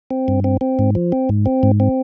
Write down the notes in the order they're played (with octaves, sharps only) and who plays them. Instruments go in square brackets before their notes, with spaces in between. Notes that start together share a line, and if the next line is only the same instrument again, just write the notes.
[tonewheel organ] C4
G2
C4
C4
G#2
F3
C4
G#2
C4
G#2
C4